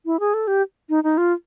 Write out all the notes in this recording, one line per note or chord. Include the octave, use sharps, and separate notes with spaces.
E4
G#4
A4
G4
D#4
D#4
F4